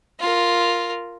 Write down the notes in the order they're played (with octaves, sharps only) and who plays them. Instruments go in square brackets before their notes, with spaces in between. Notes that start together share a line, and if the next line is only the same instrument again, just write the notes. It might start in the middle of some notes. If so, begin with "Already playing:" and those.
[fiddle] F4 A#4